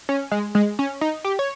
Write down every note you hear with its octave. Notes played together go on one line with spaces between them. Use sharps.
C#4
G#3
G#3
C#4
D#4
G4
C#5